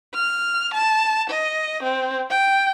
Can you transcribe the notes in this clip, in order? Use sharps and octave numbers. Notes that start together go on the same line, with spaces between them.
F6
A5
D#5
C4
G5